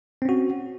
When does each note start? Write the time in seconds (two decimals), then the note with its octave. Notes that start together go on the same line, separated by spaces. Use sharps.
0.22 C4
0.25 C#4
0.29 F#4